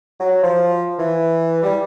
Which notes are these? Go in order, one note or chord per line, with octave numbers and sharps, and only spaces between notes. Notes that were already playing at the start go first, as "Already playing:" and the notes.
F#3
F3
E3
G3